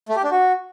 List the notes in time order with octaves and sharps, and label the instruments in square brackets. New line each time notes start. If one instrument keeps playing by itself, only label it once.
[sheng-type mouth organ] A3
G4
D4
F#4